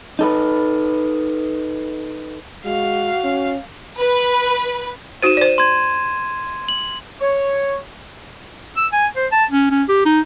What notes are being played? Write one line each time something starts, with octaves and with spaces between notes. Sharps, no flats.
D#4 A4 B4
G#3 F#4 F5
C#4
B4
D#4 F#4 C5 D#7 E7
C5 D5
C6 G#6
F#7
C#5
E6
G#5
C5
A5
C#4
C#4
G4
D#4